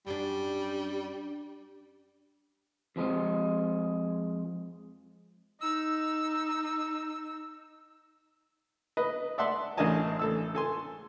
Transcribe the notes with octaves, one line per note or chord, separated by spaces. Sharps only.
F#2 G3 D4
F2 F3 G#3
D#4 E6
B4 D#5
D5 E5 F#5 A5 C6
A1 D4 A#4 D#5 G#5 A5
A1 A4 E6
A4 G#5 C6